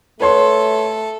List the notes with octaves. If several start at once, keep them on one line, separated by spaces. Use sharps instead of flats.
A3 A4 B4 C#5 C6